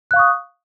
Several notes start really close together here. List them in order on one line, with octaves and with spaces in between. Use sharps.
F#6 F5 C#6 D#6